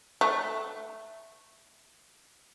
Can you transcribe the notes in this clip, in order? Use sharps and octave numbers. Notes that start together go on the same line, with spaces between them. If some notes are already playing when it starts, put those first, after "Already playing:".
A3